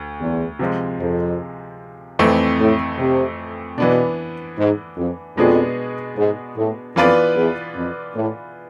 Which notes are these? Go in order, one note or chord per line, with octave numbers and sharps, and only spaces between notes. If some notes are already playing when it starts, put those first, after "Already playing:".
Already playing: D2
E2
C3 F3 G#3
F2
F2 E3 A3 C4
A2
C3
B2 E3 B3 D4
G#2
F2
F2 B2 G#3 B3 D4 G#4
G#2
A2
F2 E3 B3 F4 B4 D5
E2
F2
A2